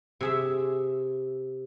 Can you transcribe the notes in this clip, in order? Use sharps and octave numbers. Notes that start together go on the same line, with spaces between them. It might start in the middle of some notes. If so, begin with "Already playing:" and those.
C3 G#4 E5